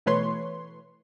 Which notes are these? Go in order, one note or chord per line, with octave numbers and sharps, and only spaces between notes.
B2 E3 A3 B4 C#5 C6